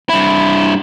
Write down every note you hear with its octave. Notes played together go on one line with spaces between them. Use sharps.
G2 E4